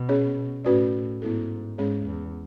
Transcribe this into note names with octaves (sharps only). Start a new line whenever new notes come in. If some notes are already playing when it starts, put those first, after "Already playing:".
Already playing: B2
C#4 G#4 C#5
A2 C#4 F#4 B4 D5
G#2 B3 E4 A4
G#2 G#3 C#4 G#4 C#5
E2